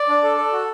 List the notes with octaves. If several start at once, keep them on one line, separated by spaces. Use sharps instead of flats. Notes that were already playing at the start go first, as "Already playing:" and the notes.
Already playing: D5
D4
A4
A4
F#4